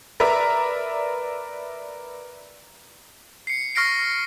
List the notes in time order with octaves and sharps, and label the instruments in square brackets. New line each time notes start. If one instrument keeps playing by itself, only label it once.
[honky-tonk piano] A#4 B4 D5 E5 A#5
[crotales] C7 C#7
C#6 F6 A#6 C7 D7